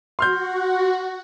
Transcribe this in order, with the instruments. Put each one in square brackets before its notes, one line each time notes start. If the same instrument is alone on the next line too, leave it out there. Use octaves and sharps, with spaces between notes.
[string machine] F#4 [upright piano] C6 F6 G6